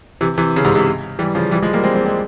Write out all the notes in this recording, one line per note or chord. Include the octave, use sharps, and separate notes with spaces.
C3 E3
C3 E3
C#3
G#2 C3
G#2 C3
E3 G3
C#3 F3
E3 G3
F3 G#3
G3 A#3
G#3 C4
G#3 C4
G#3 C4